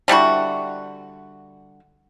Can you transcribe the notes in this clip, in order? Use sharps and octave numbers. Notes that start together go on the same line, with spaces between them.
D3 G3 E4 F#4